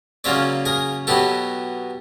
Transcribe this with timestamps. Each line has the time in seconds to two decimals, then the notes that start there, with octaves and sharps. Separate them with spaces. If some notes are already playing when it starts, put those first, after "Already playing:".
0.24 C#3 F#3 A#3 C#4 F4 D5 E5
0.65 G#4 A#4
1.07 B2 F#3 B3 E4 G4 A4